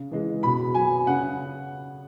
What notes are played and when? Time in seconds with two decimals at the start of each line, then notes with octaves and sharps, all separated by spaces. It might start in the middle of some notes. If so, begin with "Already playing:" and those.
Already playing: C#3
0.11 E3 G#3
0.43 B2 B5
0.75 F#3 G#5
1.07 C#3 F#5